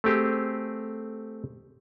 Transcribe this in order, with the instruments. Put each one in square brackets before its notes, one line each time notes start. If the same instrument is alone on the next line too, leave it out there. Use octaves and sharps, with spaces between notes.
[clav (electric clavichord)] A3 C4 G4 G#4